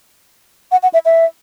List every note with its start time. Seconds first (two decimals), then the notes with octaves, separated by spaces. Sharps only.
0.72 F#5
0.83 F#5
0.93 E5
1.05 E5